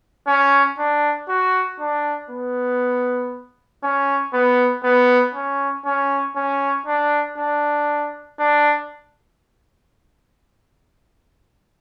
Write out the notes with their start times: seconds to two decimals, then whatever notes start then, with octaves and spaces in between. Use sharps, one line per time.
0.27 C#4
0.78 D4
1.29 F#4
1.79 D4
2.30 B3
3.83 C#4
4.33 B3
4.84 B3
5.34 C#4
5.85 C#4
6.36 C#4
6.86 D4
7.38 D4
8.39 D4